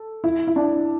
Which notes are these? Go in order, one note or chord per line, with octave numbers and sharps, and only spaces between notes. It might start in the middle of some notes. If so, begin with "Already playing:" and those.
Already playing: A4
E4
E4
D4